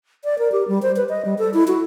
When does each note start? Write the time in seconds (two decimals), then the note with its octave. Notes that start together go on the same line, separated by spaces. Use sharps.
0.25 D5
0.39 A#4
0.52 G4
0.68 G3
0.82 C5
0.96 B4
1.09 D#5
1.25 G3
1.38 A4
1.54 E4
1.68 F#4